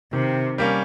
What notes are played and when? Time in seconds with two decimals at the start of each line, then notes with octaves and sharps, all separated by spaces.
0.13 C3 D#3
0.58 G3 A#3 C#4